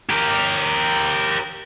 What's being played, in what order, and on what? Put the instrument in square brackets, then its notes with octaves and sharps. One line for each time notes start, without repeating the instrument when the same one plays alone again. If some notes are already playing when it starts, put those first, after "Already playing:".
[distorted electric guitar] G4 A#4